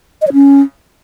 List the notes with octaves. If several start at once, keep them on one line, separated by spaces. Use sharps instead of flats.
D#5
C#5
C#4